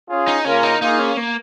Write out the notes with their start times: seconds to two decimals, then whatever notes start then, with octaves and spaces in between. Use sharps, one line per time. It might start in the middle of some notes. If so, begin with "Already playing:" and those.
0.09 C#4 F4 G#4
0.27 D#4
0.45 C#3 A#3 C#4 F4 A#4
0.63 D#4
0.81 A#3 D#4 F4 G#4
0.99 C#4
1.17 A#3